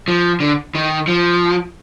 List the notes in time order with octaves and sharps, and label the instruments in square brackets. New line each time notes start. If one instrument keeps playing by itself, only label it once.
[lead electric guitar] F3
D3
D#3
F3